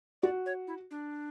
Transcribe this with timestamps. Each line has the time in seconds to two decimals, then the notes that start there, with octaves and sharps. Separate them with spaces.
0.22 F#4 D5
0.46 C#5
0.67 E4
0.91 D4